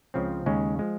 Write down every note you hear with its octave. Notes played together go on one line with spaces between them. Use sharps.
C#2 C#3 F3 C4
D#2 C#3 G#3 C#4
F3 G#3